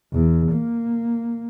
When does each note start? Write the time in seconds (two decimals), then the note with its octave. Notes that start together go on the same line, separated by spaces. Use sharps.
0.13 E2
0.52 A#3